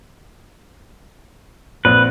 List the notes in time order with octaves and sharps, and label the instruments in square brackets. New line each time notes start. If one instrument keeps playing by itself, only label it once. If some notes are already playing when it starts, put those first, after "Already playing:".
[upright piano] A#1 C4 [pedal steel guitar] B4